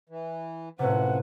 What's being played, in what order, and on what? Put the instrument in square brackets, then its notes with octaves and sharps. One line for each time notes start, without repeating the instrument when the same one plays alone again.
[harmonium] E3
[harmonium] F#2 F3 [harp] A2 C3 [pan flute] B4 [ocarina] F#5